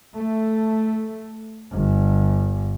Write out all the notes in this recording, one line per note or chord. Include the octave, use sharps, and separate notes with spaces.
A3
G1